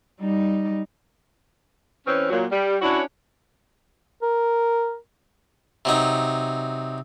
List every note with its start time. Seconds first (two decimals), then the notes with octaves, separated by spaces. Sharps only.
0.20 G3 D#4
2.06 E3 C4 C#4
2.29 A#2 F#3
2.51 G3
2.82 C#4 D4 E4 F#4 C#5
4.23 A#4
5.85 C3 F#3 D#4